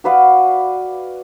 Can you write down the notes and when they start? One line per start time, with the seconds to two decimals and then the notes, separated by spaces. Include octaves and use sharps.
0.04 F#4 B4 D5 F5